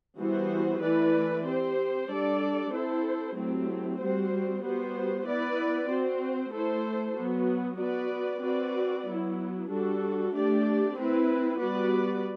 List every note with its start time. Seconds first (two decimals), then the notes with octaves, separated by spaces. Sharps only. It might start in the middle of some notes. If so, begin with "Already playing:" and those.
0.18 E3 G3 B3 F#4 C5
0.82 E3 A3 E4 B4 D5
1.45 C4 G4 C5
2.09 G3 D4 A4 D5
2.72 C4 E4 A4 C5
3.35 F#3 A3 C4 E4 G4
3.99 G3 C4 F#4 C5
4.63 G3 B3 F#4 C5
5.26 B3 E4 B4 D5
5.89 C4 F#4 C5
6.52 A3 E4 A4 C5
7.16 F#3 B3 F#4
7.79 B3 F#4 B4 D5
8.43 C4 F#4 B4 D5
9.06 F#3 B3 E4
9.69 G3 D4 F#4 A4
10.33 A3 D4 G4 D5
10.96 C4 E4 B4
11.60 G3 B3 F#4 B4 D5